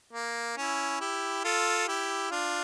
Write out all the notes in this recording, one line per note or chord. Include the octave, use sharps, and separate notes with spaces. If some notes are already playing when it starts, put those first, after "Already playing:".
A#3
C#4 E4
E4 G4
F4 A4
E4 G4
D4 F4